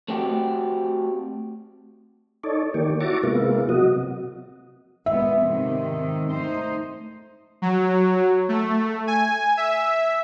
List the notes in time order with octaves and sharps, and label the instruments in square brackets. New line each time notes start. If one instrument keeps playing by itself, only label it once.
[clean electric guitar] A3 C4 F#4 G4
[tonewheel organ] D#4 A4 C#5 D5
D#3 A#3 G4 C#5 D5
E4 F#4 A5 A#5 C#6 D6
C3 G#3 A#3 B3 E4 F4
C3 F#3 F#4 D#5
[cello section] A#2 G#3 B3 [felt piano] E5
[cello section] G#2 C3 D#3
A3 D#4 C5
[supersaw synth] F#3
A3
G#5
E5